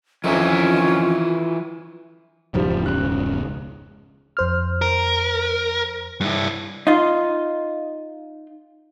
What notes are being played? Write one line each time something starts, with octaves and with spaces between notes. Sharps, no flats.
F2 D#3 E3 C#4 F4 A#4 E5
E1 C#2 G#2 F3 G3
C#3 F#6
F2 C5 F6
A#4
G2 E4
D#4 F4